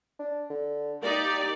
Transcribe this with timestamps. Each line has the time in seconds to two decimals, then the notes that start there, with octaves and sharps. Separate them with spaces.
0.19 D4
0.50 D3
1.03 A#3 D#4 G4 D5